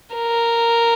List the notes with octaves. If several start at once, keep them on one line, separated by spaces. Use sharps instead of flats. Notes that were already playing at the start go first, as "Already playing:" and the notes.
A#4